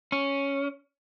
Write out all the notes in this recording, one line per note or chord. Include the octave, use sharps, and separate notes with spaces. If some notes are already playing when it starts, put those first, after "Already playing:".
C#4